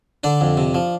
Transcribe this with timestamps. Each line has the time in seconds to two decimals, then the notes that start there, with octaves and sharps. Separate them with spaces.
0.24 D3 D4 D5
0.41 F2
0.57 C3
0.74 F3